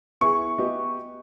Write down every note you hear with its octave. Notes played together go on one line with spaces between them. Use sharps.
B3 E4 G#4 C#6
B3 G4 B4 D#5